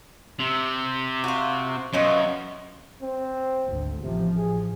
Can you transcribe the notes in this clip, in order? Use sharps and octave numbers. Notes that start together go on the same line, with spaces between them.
C3
F4 F#4
F#2 B2 F4 C#5
C4
G#1 D2
A1 C3 F3
G#4